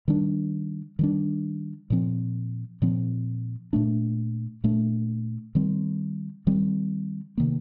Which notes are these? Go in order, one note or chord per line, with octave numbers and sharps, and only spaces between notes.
D#3 G3 D4
D#3 G3 D4
A#2 F3 C4
A#2 F3 C4
A#2 A3 D4
A#2 A3 D4
D#3 G3 C4
D#3 G3 C4
C3 D#3 A#3